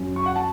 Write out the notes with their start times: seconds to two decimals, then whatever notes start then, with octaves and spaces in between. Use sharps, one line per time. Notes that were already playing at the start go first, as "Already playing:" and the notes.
Already playing: F#2 F#3
0.16 C#6
0.26 F#5
0.36 A5